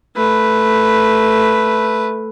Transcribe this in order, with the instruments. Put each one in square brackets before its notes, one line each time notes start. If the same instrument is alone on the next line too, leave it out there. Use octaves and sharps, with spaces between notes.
[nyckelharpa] A3 B4